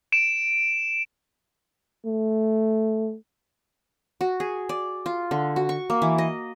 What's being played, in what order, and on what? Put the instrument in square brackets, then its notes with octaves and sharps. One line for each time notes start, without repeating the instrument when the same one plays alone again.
[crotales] D7 E7
[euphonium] A3
[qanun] F#4
G#4
D5
F4
D3
F#4
C#6
A#3
E3
D#5